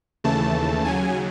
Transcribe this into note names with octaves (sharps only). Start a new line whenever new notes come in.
D#2 C#3 E3 A3 A5
D#2 C#3 F#3 G#5